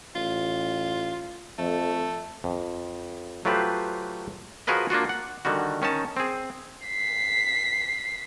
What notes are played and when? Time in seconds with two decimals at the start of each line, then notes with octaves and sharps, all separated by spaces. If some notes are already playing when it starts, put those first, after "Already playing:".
0.16 A1 F4
1.59 F2 A3
2.44 F2
3.45 F#3 A3 F4 G4 B4 C5
4.67 F3 F#4 G#4 A#4 B4 D#5
4.90 A#3 D4 F4 F#4
5.09 F#5
5.45 D3 D#3 G3 F#4
5.82 D#3 C#4 D#4 A5
6.17 C4 G#4
6.87 B6 C7